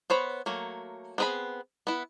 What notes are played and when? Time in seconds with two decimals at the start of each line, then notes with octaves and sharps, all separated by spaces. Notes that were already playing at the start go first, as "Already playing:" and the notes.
0.10 B3 C5 C#5 B5
0.46 F#3 A3 A#3
1.18 B3 C4 G#4 E5 B5
1.87 B3 E4